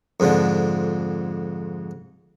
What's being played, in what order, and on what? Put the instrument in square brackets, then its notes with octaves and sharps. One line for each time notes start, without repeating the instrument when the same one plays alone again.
[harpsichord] F2 G#2 D3 F3